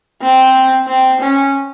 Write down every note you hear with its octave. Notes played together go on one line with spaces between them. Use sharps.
C4
C4
C#4